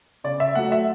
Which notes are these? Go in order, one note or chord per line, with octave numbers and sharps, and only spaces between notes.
C#3 D5
E5
F#3 A3 F#5
E5